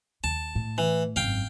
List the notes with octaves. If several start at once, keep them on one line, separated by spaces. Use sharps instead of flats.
D#2 A5
A2
E3
G#1 F#2 F5 G5